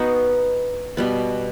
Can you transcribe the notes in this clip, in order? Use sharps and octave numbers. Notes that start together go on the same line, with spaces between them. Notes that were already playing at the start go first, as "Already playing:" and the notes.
Already playing: B3 D#4 F#4
B2 G3 B3